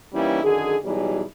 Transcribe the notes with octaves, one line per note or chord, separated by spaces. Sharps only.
E3 G3 A#3 C#4 D#4 E4
F#2 D3 D#3 G#4
B2 E3 F#3 G3 D#4 G#4